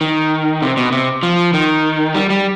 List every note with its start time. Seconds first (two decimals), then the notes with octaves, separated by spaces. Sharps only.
0.01 D#3
0.62 C3
0.77 B2
0.92 C3
1.23 F3
1.54 D#3
2.15 G3
2.30 G3